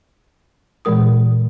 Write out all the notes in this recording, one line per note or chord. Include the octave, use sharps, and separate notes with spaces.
A#2 E3 G#3 A#4 D#6